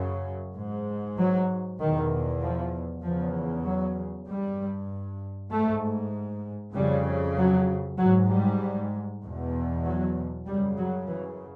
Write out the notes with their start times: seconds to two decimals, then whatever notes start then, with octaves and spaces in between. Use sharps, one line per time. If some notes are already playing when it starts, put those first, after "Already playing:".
Already playing: F#2 C#3
0.56 G#2
1.18 F#3
1.79 E2 B2 D#3
2.42 F3
3.03 E2 C#3 F3
3.65 F#3
4.27 G2 G3
5.51 G#2 A3
6.74 F2 C#3 G3
7.37 F#3
7.99 G#2 F#3
8.30 G3
9.23 E2 B2
9.84 F#3
10.46 F#2 C#3 G3
10.77 F#3
11.08 E3